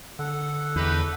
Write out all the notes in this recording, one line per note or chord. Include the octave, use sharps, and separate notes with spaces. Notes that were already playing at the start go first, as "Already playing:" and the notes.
D3 A4 F#5
E2 D#4 G4 B4